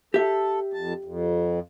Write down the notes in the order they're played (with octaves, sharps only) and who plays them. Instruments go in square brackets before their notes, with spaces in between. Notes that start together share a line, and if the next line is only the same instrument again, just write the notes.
[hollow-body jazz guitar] G4 E5 [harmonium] A4
[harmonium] F2 A5
F2